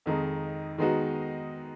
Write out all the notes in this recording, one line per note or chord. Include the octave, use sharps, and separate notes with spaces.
F2 D#3 G#3 D#4
D#3 G#3 B3 D#4 F#4